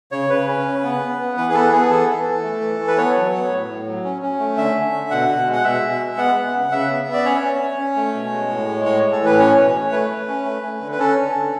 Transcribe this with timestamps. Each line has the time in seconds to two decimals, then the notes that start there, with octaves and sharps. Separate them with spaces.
0.12 C#3 C#5
0.30 C#3 B4
0.48 C#4
0.66 C#3
0.83 B3
1.01 B3
1.19 B3
1.37 E3 B4
1.49 G#4
1.54 B3 A4
1.72 B3 G#4
1.90 E3 A4
2.08 E3
2.26 E3
2.43 A3
2.61 E3
2.79 E3
2.88 B4
2.96 B3 C#5
3.15 F#3
3.33 B3
3.50 A2
3.68 A2
3.86 F#3
4.04 C#4
4.22 C#4
4.39 A3
4.57 D3 E5
4.75 D3
4.93 D3
5.11 B2 F#5
5.29 B2
5.46 G#3
5.53 F#5
5.64 B2 E5
5.82 B2
5.99 G#3
6.17 B3 F#5
6.35 B3
6.53 C#3
6.72 C#3 E5
6.89 B3
7.07 B3
7.13 D5
7.25 C#4 C#5
7.43 C#4
7.61 C#4
7.79 C#4
7.96 A3
8.14 B2
8.31 G#3
8.50 A2
8.67 G#3
8.85 A2 C#5
9.03 A2
9.12 A4
9.20 E3
9.26 B4
9.38 C#4 C#5
9.56 B2
9.75 A3
9.91 A3 B4
10.10 A3
10.28 C#4
10.45 A3
10.63 A3
10.81 D3
10.92 B4
10.98 C#4 A4
11.17 D3
11.35 D3